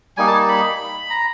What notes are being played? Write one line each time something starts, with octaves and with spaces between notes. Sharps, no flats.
G3 A#3 D#4 G#5
A5
B5
A#5